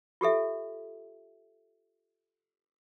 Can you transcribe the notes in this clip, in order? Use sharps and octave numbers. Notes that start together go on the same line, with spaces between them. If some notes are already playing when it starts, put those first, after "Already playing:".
F4 G4 A4 E5